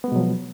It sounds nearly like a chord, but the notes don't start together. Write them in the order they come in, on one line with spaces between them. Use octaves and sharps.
B3 G#3 B2 F#3 F3